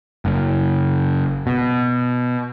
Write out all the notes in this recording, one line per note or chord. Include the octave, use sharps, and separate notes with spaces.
F#1
B2